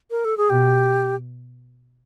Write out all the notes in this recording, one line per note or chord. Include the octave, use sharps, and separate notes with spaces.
A#4
A4
G#4
B2 G4